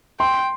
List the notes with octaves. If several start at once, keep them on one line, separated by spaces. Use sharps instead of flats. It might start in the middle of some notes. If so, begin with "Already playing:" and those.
G5 C6